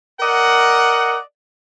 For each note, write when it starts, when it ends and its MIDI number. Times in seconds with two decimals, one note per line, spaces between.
0.20 1.18 70
0.20 1.18 74
0.20 1.18 75
0.20 1.18 78